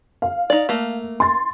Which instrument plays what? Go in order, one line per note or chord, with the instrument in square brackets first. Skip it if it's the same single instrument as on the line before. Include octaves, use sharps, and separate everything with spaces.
[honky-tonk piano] F5
[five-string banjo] D#4 D5
A3 A#3
[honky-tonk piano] C6 A6